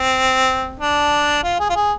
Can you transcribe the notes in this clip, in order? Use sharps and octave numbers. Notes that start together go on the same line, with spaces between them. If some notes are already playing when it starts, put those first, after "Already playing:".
Already playing: C4
D4
F4
G#4
F4
G#4